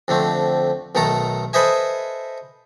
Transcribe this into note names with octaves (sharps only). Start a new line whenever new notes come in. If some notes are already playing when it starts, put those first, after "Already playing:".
F2 D3 A3 C4
B1 D#3 A3 A4 A#5
A4 B4 C5 D#5 E5 G#5